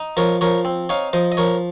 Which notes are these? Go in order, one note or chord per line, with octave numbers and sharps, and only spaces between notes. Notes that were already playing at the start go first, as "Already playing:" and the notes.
Already playing: D#4
F3 A#4 C#5
F3 A#4 C#5
C4
D#4 C#5 F5
F3 C5 D#5
D#5
F3 A#4 C#5